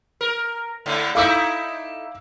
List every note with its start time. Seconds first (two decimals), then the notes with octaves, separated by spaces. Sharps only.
0.21 A#4
0.86 A2 D3 A3
1.15 D#4 E4 A4 F5 D6 E6